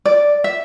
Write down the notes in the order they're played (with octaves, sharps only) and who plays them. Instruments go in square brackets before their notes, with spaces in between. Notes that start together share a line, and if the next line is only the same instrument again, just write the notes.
[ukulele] D5
E5